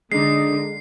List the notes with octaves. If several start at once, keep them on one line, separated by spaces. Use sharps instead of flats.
D3 G#3 D#4 C7